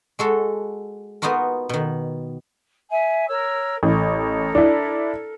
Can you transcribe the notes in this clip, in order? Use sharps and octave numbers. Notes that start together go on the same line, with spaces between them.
G#3 F#4 A4
B3 D#4 F4 F#4 A#4
B2 D#3
E5 G#5
A#4 C#5 E6
A1 A4 A#4
D4 E4